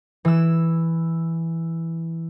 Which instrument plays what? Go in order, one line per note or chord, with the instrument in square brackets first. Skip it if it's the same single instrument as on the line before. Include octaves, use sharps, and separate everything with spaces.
[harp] E3 E6